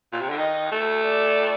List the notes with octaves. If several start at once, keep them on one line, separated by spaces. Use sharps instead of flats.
A#2
C3
D3
D#3 D#5
A3
D5